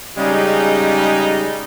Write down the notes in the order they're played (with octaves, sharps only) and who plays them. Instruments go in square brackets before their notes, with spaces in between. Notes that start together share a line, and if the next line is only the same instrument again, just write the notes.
[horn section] C#3 G3 G#3 D#4